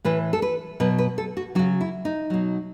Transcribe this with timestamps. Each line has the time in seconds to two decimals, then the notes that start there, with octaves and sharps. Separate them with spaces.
0.05 A2 E3 B4
0.33 A4
0.42 B4
0.80 B2 F#3 B4
0.98 B4
1.18 A4
1.37 F#4
1.55 F#3 F#4
1.59 C#3
1.81 E4
2.05 D#4
2.30 B2 F#3